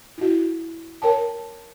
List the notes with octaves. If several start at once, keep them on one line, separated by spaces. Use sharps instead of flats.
E4 F#4
A#4 C#5 G5 A5